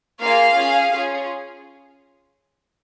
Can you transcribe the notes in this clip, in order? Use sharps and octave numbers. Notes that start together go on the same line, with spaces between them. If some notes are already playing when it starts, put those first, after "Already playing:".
A#3 F4 G#4 F5
C#4 G#4
C#4 F4 G#4